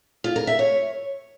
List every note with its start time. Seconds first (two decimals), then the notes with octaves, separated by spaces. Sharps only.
0.24 F4
0.36 A#4
0.47 E5
0.59 C#5